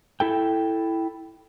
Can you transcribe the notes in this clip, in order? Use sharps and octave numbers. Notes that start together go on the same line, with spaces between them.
E4 A4 G5